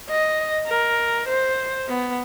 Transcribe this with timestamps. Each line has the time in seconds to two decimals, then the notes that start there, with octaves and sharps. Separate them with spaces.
0.10 D#5
0.68 A#4
1.28 C5
1.89 B3